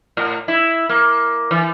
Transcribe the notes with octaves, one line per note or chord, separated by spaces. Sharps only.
A2
E4
A#3
E3